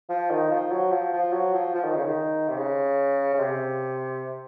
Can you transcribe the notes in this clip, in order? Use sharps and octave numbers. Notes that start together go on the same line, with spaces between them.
F3
D#3
F3
F#3
F3
F3
F#3
F3
F3
D#3
C#3
D#3
C3
C#3
C#3
C3